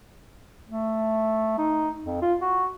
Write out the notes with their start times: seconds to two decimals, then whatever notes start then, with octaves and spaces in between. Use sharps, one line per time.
0.69 A3
1.58 D#4
2.04 F2
2.22 F4
2.41 F#4